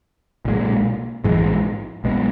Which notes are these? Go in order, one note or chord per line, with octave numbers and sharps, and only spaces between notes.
B1 A#2 G#3
A#1 G#2 E3 G#3
B1 B2 G#3 B3